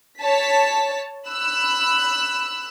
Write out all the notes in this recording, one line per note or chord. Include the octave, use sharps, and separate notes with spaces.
C#5 A5 B6
B5 E6 F#6